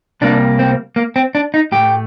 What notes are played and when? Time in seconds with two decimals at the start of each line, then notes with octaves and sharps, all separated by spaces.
0.21 C2 C3 G3 A#3 D4
0.59 C4
0.96 A#3
1.16 C4
1.35 D4
1.54 D#4
1.72 A2 A3 G4